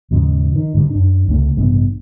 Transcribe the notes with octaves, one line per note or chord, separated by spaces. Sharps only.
D#2 G#2 C#3 F3
D#3
G#2 D3 G3
F#2 D4
C#2 C3 F#3 A3
A1 G2 C3 B3